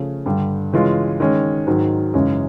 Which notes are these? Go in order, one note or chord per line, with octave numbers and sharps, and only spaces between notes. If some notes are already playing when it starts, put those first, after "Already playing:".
Already playing: C#3 F3 A3 C#4
G2 D3 G3
C#3 E3 G#3 C#4 F4
D#3 G#3 C#4
G#2 D#3 F#3
F#2 C#3 E3 G#3 C#4